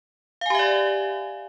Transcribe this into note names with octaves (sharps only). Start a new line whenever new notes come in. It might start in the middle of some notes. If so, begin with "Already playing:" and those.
G4 D5 E5 F5 G#5